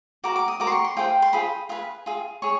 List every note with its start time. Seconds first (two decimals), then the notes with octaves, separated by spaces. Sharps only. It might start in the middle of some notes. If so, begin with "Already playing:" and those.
0.24 F#4 A#4 D6
0.36 D6
0.48 D#6
0.60 F#4 A#4 D6
0.67 C6
0.72 C#6
0.84 C6
0.97 F4 G#4 C5 G5
1.22 C6
1.32 F4 G#4 C5 B5
1.69 F4 G#4 B4
2.06 F4 G#4
2.42 G#4 C#5 C#6